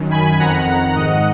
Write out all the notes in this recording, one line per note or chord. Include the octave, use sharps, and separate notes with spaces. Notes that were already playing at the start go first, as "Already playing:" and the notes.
Already playing: F#2 D#3
G#5 B5
F2 D#3 F#5 A#5
F#5 A#5
G#2 D#3 D#5 F#5